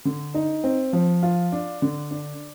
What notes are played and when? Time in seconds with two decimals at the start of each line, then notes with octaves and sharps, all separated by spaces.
0.05 D3
0.34 D#4
0.64 C4
0.93 F3
1.23 F4
1.52 D4
1.82 D3
2.11 D4